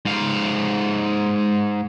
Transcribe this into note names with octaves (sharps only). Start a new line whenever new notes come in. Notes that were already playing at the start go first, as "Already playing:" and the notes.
G#2 F5